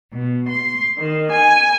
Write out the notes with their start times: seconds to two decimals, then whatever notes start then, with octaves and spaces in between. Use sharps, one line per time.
0.13 B2
0.49 C6
0.98 D#3
1.32 G#5